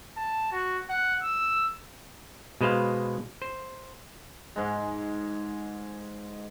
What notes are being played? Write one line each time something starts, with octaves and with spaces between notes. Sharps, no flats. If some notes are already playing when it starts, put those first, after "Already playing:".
A5
F#4
F#5
E6
B2 G#3 B4 C5 F5
C5
G#2 G#3